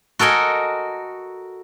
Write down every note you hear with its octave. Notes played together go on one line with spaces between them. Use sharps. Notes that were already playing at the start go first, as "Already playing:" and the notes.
F#4 A4 A#4 D#5 G#5